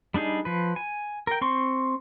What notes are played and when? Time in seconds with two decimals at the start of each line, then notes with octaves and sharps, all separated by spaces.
0.14 G3 D4 D#4 G#4
0.45 F3 B4
0.76 G#5
1.27 A#4 G5
1.41 C4 C6 C#6